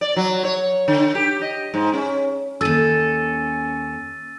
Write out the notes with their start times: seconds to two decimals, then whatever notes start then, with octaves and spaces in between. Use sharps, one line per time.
0.01 D5
0.17 F#3
0.45 C#5
0.88 D3
1.15 G4
1.42 D#5
1.74 G#2
1.94 C#4
2.61 D#2 C#4 A4 E6 A6 D#7